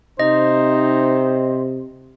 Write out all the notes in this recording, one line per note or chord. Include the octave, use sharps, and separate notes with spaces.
C3 D#4 C5 D#5